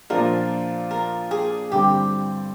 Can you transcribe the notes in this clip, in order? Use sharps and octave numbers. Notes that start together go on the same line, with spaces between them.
A#2 F3 A#3 D4 F4 A#4
A#4
G#4
G2 D3 G3 C4 G4